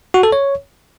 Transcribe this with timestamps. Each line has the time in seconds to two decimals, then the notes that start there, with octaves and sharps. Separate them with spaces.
0.14 F#4
0.23 A4
0.32 C#5